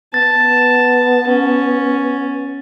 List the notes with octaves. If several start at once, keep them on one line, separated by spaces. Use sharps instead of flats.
B3 A5 A6
C#4